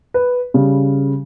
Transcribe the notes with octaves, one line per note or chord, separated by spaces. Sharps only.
B4
C#3 G3